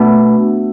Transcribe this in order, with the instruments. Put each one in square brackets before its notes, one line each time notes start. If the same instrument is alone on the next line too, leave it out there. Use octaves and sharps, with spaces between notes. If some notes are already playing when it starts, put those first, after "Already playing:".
Already playing: [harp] B2 A3 D4